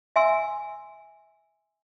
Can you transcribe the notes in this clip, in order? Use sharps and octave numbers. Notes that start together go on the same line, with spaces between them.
E5 G#5 C6 E6